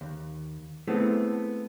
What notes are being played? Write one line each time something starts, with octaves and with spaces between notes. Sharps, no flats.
D#2
G#3 A3 B3 C4 E4